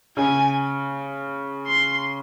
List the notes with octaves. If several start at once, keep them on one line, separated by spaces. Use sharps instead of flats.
C#3 G#5
C6